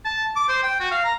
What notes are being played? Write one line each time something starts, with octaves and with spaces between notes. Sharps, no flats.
A5
D6
C5
G5
F#4
F5
A#5